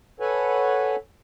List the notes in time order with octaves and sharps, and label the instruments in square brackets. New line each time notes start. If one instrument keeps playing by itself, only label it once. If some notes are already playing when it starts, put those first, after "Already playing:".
[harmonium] A4 B4 C#5 F#5 G#5